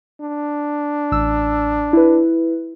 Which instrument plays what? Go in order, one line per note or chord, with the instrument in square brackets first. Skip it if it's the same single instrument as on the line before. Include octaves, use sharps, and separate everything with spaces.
[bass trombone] D4
[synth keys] A1 E6
E4 B4